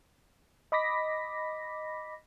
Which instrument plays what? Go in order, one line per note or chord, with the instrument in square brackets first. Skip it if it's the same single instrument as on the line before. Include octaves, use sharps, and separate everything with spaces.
[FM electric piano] D#5 B5 D6 A#6 B6